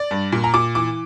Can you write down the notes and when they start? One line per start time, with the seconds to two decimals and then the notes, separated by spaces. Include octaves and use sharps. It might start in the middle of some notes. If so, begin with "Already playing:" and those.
Already playing: D5
0.11 G2
0.33 A#2
0.44 A#5
0.54 A#2 D6
0.75 E3 D6